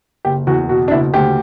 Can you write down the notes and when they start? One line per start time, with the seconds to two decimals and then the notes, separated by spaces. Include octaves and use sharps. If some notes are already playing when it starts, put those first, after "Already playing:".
0.25 F#1 G4
0.47 E2 F#4
0.69 B2 F#4
0.88 D4
0.91 F#1 E4
1.13 D2 G4